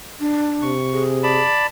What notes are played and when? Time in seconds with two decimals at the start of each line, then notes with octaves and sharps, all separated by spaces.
0.20 D4
0.62 C3 C#6
0.93 G#4
1.23 D5 A5 B5